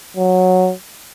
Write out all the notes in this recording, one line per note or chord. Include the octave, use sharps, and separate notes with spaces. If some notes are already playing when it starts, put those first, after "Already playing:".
F#3